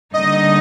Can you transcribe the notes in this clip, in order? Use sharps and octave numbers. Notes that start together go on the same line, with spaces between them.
D3 G3 A#3 D#4 D#5